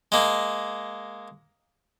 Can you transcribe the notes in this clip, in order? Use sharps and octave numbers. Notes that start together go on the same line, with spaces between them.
G#3 A#3